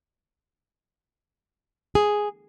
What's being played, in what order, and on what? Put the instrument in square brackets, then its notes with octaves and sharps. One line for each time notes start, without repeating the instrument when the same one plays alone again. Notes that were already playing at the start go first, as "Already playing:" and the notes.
[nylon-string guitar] G#4